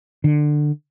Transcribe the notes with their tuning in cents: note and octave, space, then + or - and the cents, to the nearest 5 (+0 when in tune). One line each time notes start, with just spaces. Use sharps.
D3 +20